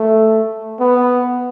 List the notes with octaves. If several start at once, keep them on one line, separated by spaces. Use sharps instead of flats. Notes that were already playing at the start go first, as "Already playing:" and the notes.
Already playing: A3
B3